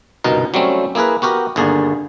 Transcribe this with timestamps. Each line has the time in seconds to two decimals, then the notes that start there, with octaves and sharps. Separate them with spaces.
0.24 G1 C2 B2 D#4 A#4
0.54 F#3 G3 A3 C4 C#4
0.95 A#3 E4 G#4 A#4 B4
1.22 B3 F#4 G4 A#4
1.56 G1 D#2 D3 G#4 A#4